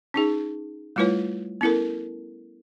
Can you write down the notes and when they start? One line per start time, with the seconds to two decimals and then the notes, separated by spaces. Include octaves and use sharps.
0.14 C#4 D#4 G#4
0.96 G3 A3 E4 F4 B4 C#5
1.61 B3 C#4 E4 A4 A#4